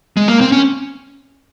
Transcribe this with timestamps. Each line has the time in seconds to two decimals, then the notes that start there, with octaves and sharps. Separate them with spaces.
0.17 G#3
0.28 A#3
0.41 C4
0.52 C#4